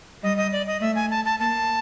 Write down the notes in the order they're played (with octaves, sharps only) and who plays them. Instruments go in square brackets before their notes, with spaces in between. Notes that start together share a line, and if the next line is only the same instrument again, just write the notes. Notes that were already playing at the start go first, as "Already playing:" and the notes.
[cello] G3 [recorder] D#5
[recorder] D#5
D5
D#5
[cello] A3 [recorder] E5
[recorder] G#5
A5
A5
[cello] A#3 [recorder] A5